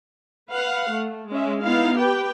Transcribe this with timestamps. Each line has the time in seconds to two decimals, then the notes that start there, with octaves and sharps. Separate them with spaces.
0.49 B4 F5 F#5
0.89 A3
1.30 G#3 C#4 E5
1.62 B3 D#4 E4 F5
1.97 G4 B4 G5